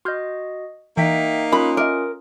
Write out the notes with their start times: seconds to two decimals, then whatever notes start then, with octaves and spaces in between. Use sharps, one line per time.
0.05 F#4 D#5 C6 F6 G6
0.97 E3 A#3 D#4 E5 G5 B6
1.52 C#4 F4 A#4 B5 D#6
1.77 A#4 D#5 E5 D6